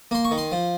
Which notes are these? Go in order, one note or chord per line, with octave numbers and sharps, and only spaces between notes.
A#3 C6
C#6
D#3
C6
F3